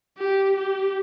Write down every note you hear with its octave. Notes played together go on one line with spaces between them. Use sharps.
G4
G4